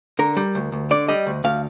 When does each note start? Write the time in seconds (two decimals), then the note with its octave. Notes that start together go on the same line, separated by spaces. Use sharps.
0.19 D3 A#4
0.37 G3
0.55 D2
0.72 D2
0.91 D3 D5
1.08 G3 D#5
1.27 D2
1.44 D2 F5